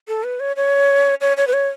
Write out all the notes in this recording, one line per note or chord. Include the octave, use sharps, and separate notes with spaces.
A4
B4
C#5
C#5
C#5
C#5
B4
C#5